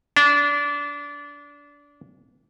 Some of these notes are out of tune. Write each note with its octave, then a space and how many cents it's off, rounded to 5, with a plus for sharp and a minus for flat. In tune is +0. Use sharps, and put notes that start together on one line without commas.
D4 -25